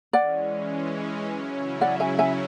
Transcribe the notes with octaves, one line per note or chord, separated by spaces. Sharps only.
E3 G#3 C#4 D5 F#5
C#3 F#3 C#4 E4
D5 F#5
E5 G#5
E5 G#5